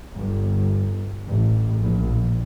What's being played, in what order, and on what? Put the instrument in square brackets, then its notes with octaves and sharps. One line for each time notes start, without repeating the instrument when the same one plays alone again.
[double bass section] G1
A1
A#1